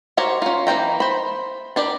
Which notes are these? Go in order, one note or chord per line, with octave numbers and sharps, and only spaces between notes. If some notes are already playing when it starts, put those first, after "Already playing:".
F#4 G4 A#4 C5 C#5
C#4 F4
E3 A#3 G5 A#5
C5 B5
D4 G4 A#4 D5